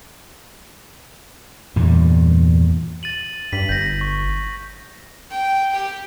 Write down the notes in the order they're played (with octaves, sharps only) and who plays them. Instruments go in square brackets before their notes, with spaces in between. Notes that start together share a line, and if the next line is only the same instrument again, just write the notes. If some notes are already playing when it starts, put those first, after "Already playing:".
[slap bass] E2 G2 A#2
[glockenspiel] A6 D#7 F#7
[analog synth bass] G2 [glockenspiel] B6 F#7
[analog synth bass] G1 [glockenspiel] G6 A#6
[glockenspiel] C#6
[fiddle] G5
G4 G5